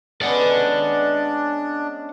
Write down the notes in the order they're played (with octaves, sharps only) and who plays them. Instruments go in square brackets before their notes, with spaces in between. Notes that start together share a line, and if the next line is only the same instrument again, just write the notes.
[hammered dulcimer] G#3 B3 C#4 [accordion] D4 [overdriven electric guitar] D5 F#5